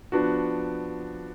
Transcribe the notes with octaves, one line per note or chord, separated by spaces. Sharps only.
F3 B3 D4 F#4